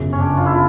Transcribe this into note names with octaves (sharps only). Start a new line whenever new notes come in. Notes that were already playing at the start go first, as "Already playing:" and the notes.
Already playing: G1 F#2 C#3
C#4
D4
F4
E4